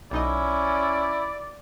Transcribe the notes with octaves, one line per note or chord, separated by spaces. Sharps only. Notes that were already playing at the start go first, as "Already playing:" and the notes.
B1 C#4 D#4 E4 D5 D#5